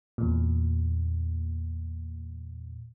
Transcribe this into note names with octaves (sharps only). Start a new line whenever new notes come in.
E2 A#2